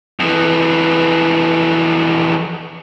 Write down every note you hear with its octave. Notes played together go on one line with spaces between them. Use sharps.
F2 E3